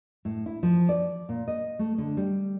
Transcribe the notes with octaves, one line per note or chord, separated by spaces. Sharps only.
A2
E4
F3
D5
A#2
D#5
A3
D3
G3